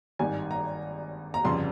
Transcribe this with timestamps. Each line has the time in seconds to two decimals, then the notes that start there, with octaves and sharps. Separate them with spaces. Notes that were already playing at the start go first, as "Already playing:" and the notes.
0.19 G#1 G2 D#3 G3 G#5
0.51 A#5
1.34 A#5
1.44 G1 F2 C#3 G3 C6